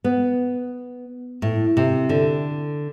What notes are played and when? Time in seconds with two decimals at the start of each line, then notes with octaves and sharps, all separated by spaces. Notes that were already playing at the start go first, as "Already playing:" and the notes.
0.04 B3
1.42 A2
1.77 C3
2.09 D3